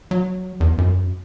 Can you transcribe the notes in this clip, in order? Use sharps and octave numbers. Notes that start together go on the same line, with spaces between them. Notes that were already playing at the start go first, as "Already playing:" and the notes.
F#3
E2
F#2